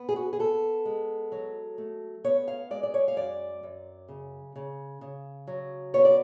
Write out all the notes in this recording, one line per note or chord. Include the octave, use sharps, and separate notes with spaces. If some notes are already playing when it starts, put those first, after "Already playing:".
Already playing: B3
G#4
F#4
G#4
B3 A4
G#3
F#3
A3
B3 C#5
F5
G#3 D5
D5
C#5
F5
F#2 D5
F#2
C#3
C#3
C#3
F#3
B3 C#5
D5